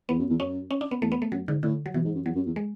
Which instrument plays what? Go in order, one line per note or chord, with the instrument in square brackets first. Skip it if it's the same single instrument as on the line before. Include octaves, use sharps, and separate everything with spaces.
[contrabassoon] E2 [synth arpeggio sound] B3
[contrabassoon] F#2
E2
[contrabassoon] F#2 [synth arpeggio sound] C#4
[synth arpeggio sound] C#4
D4
B3
[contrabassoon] E2 [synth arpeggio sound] A3
[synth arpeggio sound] B3
A3
[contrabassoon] F#2 [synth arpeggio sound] F#3
[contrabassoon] G#2 [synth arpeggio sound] D3
[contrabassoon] A2 [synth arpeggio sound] D3
[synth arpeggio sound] F#3
[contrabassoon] B2 [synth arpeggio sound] E3
[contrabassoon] G#2
F#2
[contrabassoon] E2 [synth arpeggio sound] F#3
[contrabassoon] F#2
E2
[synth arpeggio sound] G#3